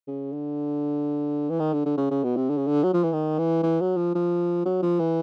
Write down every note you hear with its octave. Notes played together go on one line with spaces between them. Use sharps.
C#3
D3
E3
D#3
D3
D3
C#3
C#3
B2
C3
D3
C#3
D3
F#3
F3
E3
D#3
E3
E3
F#3
F3
F3
F#3
F3
E3